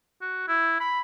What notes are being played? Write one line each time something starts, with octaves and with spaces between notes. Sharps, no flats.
F#4
E4
B5